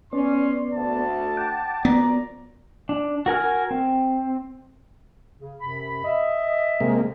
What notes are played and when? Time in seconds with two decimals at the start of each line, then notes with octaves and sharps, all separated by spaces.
0.13 B3 C#4 D5 C6
0.74 D2 A5
1.37 F#5 G5 D6
1.85 F#2 F3 B3 D5 A#5
2.89 D4
3.26 F#4 A#4 G#5 F6
3.71 C4
5.40 C#3
5.61 F#2 C3 B5
6.04 D#5 E5
6.80 C3 G#3 A#3